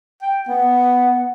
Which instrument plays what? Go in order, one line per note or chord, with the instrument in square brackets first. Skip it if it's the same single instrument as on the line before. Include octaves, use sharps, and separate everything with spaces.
[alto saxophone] G5
[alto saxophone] B3 [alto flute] F#5